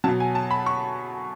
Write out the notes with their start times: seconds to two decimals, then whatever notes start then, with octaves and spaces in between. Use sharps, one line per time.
0.04 B2 F#3 A5
0.20 G#5
0.35 A5
0.51 B5
0.66 C#6